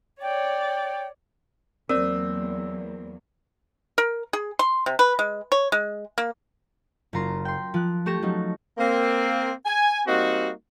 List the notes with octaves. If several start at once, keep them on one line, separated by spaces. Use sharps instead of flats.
C#5 D5 G5
E2 F#3 A#3 C4 A#4 D5 E6
A#4
G#4
C6
C3
B4
G#3
C#5
G#3
A#3
F#1 C#3 F4 A#5 C6
G5 C6
F3 F#6
A3 G4 C#6 A#6 E7
F3 F#3 C#4 D#4
A#3 C4
G#5
G3 A#3 C4 D#4 F#4